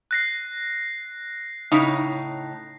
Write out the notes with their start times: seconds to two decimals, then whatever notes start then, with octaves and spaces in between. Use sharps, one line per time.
0.11 F#6 A#6 C7
1.72 A2 C#3 D#4